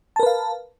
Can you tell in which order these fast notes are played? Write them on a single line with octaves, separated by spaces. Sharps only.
A5 A#4 B4 F5